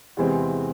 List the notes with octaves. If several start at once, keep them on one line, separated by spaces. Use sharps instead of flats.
E2 C3 E3 G#3 C4